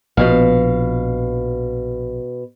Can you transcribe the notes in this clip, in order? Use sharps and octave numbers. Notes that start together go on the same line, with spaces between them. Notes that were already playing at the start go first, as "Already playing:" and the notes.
A#1 B2 F3 F5